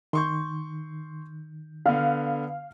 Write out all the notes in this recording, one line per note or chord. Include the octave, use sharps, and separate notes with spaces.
D#3 C6 C#6 G6
D3 B3 F5 F6